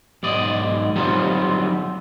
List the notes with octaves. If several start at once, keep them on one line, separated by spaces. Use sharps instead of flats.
B1 G#2 D5 D#5
F#3 G3 B3 C4 D#4 F4